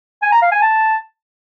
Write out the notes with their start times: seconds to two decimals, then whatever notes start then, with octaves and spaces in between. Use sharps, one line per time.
0.22 G#5
0.32 A#5
0.42 F5
0.52 G#5
0.62 A5